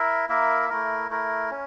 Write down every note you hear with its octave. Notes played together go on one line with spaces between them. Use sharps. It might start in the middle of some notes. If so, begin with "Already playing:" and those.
Already playing: E4 A#4 E5
A#3 E4 A#4 E5
A3 E4 A#4
A3 E4 A#4
C#4